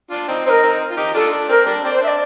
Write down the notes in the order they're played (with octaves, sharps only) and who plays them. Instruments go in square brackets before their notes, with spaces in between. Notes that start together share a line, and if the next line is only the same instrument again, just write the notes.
[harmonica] D4 F4
C4 D#4
[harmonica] C4 D#4 [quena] A#4 C5
[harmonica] C4 D#4
F4
D#4 G4
[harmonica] D4 F4 [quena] A4
[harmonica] D4
[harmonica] C4 [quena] A#4
[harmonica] G3 A#3 D4
[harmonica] C4 [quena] D5
[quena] C5
[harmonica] D4 [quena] E5
[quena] D5